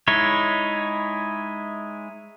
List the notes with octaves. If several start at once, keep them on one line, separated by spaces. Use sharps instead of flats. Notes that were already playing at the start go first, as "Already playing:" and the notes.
G#3 D#4 E4 C#5